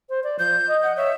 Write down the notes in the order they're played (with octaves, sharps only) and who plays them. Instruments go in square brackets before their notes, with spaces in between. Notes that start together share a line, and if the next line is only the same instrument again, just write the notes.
[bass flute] C5
D5
[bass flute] F3 [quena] G6
[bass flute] D#5
[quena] F#5
[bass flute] C#5 [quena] E5